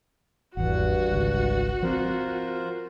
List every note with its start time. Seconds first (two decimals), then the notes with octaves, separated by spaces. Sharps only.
0.57 G#1 E2 G2 F#4 F#5
1.12 G#1 C#2
1.82 F3 C4 F4 A#4 C5